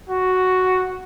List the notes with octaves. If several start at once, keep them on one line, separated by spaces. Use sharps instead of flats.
F#4